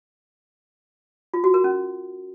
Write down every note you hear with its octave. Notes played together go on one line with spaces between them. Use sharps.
F4
F#4
A#4
C#4